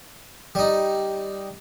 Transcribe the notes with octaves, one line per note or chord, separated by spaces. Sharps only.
G3 D#4